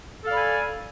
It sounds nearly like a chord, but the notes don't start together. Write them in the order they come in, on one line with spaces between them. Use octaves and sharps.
A4 F5 D5 B5 G#5